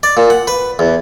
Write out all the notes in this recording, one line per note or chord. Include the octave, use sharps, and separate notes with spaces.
D5
A#2
F#5
B4
E2